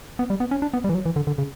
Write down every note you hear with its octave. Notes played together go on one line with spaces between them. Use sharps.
B3
G3
B3
C#4
D4
B3
G3
E3
F#3
E3
D3
D3
C#3